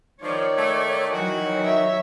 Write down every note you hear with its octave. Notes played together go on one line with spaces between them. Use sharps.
D#3 F3 D#4 C#5 D5
A3
E3 F#3 F#4
C#5 E5